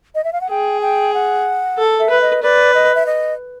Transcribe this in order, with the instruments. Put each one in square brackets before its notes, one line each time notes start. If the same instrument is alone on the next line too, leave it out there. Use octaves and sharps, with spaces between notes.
[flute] D#5
E5
F5
F#5
[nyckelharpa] G#4 [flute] G5
[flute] G5
F#5
[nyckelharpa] A4
[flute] E5
[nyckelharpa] B4
[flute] D#5
[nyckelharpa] B4 [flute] D5
[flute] D#5
E5
D#5